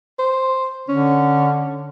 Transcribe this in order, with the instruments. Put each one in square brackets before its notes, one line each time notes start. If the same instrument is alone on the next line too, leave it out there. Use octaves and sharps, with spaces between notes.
[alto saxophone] C5
[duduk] D3 [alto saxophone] C#4